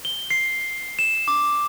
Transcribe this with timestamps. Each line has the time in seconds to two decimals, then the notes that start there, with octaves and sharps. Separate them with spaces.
0.05 G7
0.30 C7
0.99 E7
1.28 D6